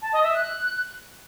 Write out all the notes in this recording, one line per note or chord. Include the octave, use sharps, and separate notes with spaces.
A5
D#5
E5
F#6